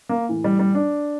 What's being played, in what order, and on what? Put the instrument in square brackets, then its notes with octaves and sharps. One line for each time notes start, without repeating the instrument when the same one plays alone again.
[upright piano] A#3
A2 E3
G3
G3
D4